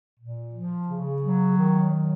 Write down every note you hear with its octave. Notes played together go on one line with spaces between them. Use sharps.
A#2
F3
C#3
F#3
D#3
F#3